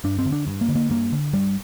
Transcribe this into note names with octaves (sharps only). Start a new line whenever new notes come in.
G2 D4
C4
D3
D4
G2
A#3
D3
A#3
G2 A#3
D3
G2 G3